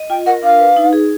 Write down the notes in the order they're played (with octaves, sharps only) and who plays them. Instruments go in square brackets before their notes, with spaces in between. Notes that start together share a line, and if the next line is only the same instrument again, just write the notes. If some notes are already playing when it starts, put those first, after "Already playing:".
Already playing: [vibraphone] D#5
[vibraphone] F4 [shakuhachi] G5
[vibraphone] A#4 [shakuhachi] F#5
[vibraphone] D4 [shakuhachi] F5
[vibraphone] B4
D#4
G#4